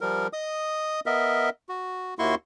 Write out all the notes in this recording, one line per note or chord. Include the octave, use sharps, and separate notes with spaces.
F3 G3 A#4
D#5 D#6
B3 A#4 D#5 E5
F#4
D#2 A#3 E4 F#4 C6 C#6